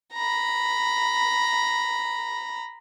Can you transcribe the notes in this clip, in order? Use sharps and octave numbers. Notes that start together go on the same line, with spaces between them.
A#5 B5